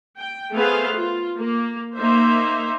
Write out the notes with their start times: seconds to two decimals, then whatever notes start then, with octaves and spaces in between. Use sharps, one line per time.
0.19 G5
0.54 A3 B3 G#4 B4 C5 F5
0.94 F4
1.39 A#3
1.97 A#3 D#4 C5 E5